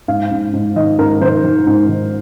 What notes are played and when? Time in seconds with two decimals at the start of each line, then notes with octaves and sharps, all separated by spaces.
0.08 G#2 F5
0.31 G#2
0.53 G#2
0.76 D#3 D#5
0.99 G#2 A#4
1.21 D#3 C5
1.44 D#3
1.67 G#2
1.89 D#3